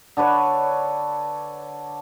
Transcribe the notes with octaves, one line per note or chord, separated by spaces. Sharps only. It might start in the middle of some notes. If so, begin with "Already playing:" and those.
D3 D4 B4 C#5